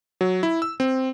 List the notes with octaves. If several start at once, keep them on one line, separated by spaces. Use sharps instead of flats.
F#3
E4
E6
C4